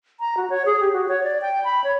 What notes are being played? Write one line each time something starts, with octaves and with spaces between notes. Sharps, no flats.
A#5
F#4
C#5
G#4
G4
F#4
C#5
D5
G5
B5
C#5